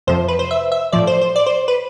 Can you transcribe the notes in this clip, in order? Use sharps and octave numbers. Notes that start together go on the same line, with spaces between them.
F2 C3 F3 C5
B4
C5
E5
E5
A2 F3 D5
C5
C5
D5
C5
B4